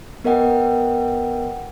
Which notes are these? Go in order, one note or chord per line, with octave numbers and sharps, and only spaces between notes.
B3 A#4 D#5 F#5 G5